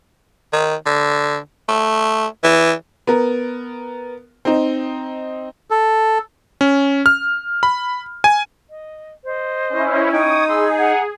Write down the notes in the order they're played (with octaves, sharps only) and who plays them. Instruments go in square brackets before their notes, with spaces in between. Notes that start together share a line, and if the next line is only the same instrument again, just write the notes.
[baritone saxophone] D#3
D3
A3
E3
[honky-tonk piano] B3 A#4
C4 D#4
[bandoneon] A4
[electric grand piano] C#4
F6
B5
G#5
[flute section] D#5
C5 D#5
[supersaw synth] C#4 E4
[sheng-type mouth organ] D#4 [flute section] G5 C#6 G#6 [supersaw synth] D#6
[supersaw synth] G#4 [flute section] B5 C6 E6
[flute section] F#5 A#5